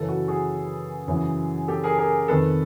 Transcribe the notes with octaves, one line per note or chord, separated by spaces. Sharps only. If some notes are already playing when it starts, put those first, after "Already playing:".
Already playing: F#2 C#3 E3 A4 B4
F#4
F#4 G#4
F#2 C#3 E3
G4 A4
G#4 A#4
G#4 A#4
F2 C3 D#3 A4 B4